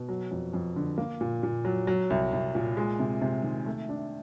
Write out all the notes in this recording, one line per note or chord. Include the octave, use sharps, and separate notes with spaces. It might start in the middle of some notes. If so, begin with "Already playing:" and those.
Already playing: B2
F#3
F2
F2
D3
A#3
A#2
A#2
F#3
F#3
C2
C2
A#2
G#3
C3
C3
D#3
A3
D4